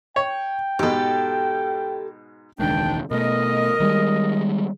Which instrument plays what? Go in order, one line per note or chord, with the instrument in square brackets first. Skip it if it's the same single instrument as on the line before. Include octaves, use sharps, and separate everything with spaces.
[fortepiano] C#5 [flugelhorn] G5
[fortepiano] G#2 B2 [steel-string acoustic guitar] G4 A4
[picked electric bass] E1 C#2 D#3 [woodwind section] D4 G5
[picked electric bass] B2 A3 [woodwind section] A#4 D#5
[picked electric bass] D#3 G3 G#3